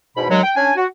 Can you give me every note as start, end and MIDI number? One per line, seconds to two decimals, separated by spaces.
0.17 0.26 40
0.17 0.26 44
0.17 0.26 47
0.17 0.26 83
0.29 0.43 39
0.29 0.43 54
0.29 0.43 56
0.44 0.51 79
0.56 0.71 61
0.56 0.71 62
0.56 0.71 80
0.76 0.86 66